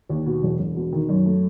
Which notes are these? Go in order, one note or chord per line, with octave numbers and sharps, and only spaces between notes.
D#2
B2
E1
E1
B2
D#3
F#2
A3